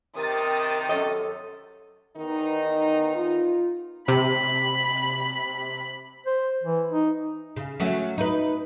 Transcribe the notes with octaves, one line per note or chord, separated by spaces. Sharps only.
C3 D#3 A#4 D#6 A6
F#2 A4 C#5 D#5
E2 D#3 B3 D#4
F4
C3 B5
C5
E3
D#4
C#3
F#3 A3 C#4
D#4 B4